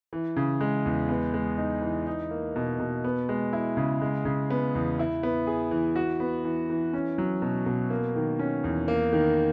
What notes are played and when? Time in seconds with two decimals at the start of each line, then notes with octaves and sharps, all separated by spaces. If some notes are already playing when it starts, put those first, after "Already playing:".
0.13 E3
0.36 C#3
0.61 G#3
0.86 E2
1.09 B3
1.34 G#3
1.58 D#4
1.82 E3
2.07 D#4
2.31 A#3
2.56 B2
2.79 B2
3.04 B3
3.29 G#3
3.53 E4
3.77 C#3
4.01 G#3
4.25 C#3
4.50 B3
4.75 E2
4.99 E4
5.23 B3
5.47 G#4
5.71 E3
5.96 F#4
6.20 B3
6.44 E3
6.70 E3
6.93 C#4
7.18 F#3
7.42 B2
7.66 B2
7.90 A#3
8.16 D#3
8.39 C#4
8.64 E2
8.88 A#3
9.13 D#3